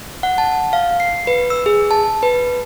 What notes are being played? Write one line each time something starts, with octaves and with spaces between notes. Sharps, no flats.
F#5
A5
F5
C7
B4
E6
G#4
A5
B4